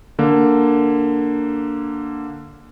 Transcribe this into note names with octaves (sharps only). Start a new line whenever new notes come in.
D3 A#3